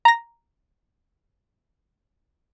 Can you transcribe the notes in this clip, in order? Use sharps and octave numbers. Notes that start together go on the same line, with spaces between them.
A#5 A#6